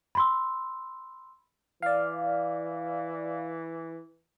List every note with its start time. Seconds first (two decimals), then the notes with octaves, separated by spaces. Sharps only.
0.15 B5 C6 E6
1.82 E3 D5 F5